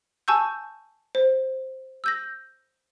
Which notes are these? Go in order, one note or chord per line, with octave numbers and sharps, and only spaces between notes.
G#5 A5 C#6 E6 G6
C5
E6 G6 A#6